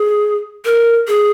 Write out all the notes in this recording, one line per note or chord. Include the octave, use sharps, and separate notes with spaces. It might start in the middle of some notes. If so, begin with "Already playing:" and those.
Already playing: G#4
A#4
G#4